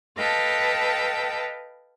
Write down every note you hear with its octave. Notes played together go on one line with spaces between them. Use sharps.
A4 B4 D#5 F5 G5 A5